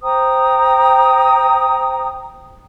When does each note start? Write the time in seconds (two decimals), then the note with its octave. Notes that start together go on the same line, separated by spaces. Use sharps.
0.03 C5 G5 A#5 D#6